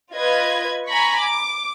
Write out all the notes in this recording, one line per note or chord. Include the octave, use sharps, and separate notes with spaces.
F4 B4 D#5 G#6
G#5 A#5 B5 C#6
D6